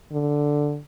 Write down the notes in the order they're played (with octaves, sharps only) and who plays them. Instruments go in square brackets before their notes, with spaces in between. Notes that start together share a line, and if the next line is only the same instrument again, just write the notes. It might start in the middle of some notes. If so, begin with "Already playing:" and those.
[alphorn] D3